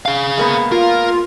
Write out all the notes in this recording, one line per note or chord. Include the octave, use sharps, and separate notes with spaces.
G#4 F5
G#3 A#3 B3
F4 A#4